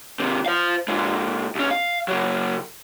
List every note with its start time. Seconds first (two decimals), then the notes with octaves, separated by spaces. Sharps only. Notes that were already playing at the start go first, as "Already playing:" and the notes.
0.20 D#2 C3
0.46 C5 F5
0.88 A#2 G#3
1.55 C2 C#4
1.71 F5
2.08 C#3 F#3